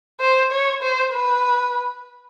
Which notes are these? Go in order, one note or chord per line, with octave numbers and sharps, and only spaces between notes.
C5
C#5
C5
B4